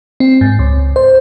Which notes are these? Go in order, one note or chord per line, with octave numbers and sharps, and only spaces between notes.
C4
G#2
C#2
C5